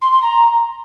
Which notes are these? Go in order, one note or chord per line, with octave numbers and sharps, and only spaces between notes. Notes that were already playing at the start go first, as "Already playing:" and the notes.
C6
C6
A#5